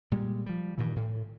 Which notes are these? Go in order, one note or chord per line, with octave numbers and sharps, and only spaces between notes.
A#2 G3 G#3
F3 G3
G2 A#2 D#3 E3
A2